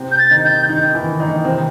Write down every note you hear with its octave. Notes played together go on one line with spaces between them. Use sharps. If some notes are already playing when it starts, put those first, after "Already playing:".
Already playing: C3 C4
G6
A6
D#3 D#4
G6
D#3 D#4
E3 E4
D#3 D#4
C3 C4